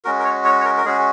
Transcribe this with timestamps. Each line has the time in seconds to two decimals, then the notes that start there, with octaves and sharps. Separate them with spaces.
0.05 G#3 C#4 F#4 A#4
0.19 A#4
0.24 C#5
0.44 C#5
0.61 C#5
0.65 A#4
0.77 A#4
0.85 G#3 C#4 F#4 G#4